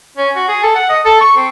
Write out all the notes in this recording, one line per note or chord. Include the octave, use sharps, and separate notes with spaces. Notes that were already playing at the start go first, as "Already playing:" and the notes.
C#4
F#4
G#4
A4
F#5
D#5
A4
C#6
C4